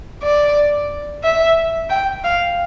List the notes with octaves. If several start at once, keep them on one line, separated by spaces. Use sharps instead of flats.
D5
E5
G5
F5